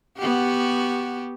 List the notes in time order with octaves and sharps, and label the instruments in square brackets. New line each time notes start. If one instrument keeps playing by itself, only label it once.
[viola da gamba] B3 F#4 G4